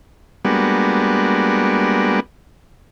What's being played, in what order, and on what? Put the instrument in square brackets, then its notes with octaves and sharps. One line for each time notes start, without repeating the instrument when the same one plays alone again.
[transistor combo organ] G3 G#3 A#3 B3 D4 F#4